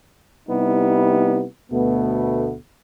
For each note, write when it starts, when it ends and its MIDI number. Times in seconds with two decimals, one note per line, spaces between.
0.48 1.44 48
0.48 1.44 55
0.48 1.44 59
0.48 1.44 63
0.48 1.44 64
1.71 2.55 38
1.71 2.55 47
1.71 2.55 57
1.71 2.55 59